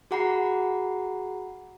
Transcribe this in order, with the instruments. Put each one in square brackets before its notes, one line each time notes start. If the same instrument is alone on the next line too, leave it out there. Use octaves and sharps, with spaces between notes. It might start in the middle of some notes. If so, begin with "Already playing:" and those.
[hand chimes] F#4 G#4 F#5 A#5 B5 C7